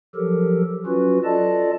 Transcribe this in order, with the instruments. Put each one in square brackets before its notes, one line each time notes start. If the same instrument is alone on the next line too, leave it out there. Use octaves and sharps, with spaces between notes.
[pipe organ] F3 F#3 G4 A4 A#4
F#3 C#4 F4 F#4 B4
F4 A4 D5 D#5 A5